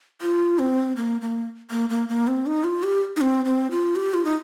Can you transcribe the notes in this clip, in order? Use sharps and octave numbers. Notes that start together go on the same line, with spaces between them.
F4
C4
A#3
A#3
A#3
A#3
A#3
C4
D#4
F4
G4
D#4
C4
C4
F4
G4
F4
D#4